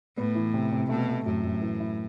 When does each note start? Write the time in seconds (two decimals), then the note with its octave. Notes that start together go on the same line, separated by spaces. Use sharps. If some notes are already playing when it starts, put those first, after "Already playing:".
0.17 A2 B3
0.35 E3
0.54 C3
0.72 C3
0.89 B2 A3
1.08 A3
1.26 F#2 A2
1.44 F#2
1.62 E3
1.80 E4